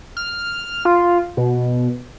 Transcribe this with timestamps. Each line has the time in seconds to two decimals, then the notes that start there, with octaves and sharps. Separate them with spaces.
0.17 F6
0.85 F4
1.37 B2